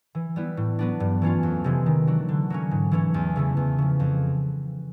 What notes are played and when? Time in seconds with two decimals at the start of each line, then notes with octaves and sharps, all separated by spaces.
0.15 E3
0.36 G3 B3 E4
0.57 A2
0.79 F#3 B3 D4
1.00 G2
1.22 E3 A3 C#4 F4
1.43 F2
1.64 C3 E3 G#3
1.86 D#3
2.07 F#3 A3 D4
2.29 D3
2.50 F#3 A#3 C#4
2.71 G#2
2.91 E3 A3 C#4
3.14 E2
3.36 C#3 E3 A3
3.57 E2
3.78 C#3 F3
4.00 F2